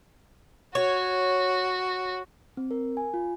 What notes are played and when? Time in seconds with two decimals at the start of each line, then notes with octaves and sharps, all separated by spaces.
0.75 F#4 C#5
2.57 C4
2.71 A#4
2.97 G#5
3.14 F4